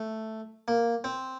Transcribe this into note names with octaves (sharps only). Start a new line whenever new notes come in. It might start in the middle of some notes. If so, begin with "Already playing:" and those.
Already playing: A3
A#3
C4